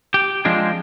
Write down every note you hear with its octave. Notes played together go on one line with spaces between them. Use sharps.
G4
F3 G#3 C4 D4